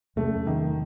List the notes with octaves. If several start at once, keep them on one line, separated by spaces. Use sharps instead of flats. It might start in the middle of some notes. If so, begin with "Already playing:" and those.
E2 C3 F#3 A3 C#4
D#3